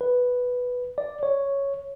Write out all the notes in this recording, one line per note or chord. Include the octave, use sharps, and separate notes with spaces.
B4
D5
C#5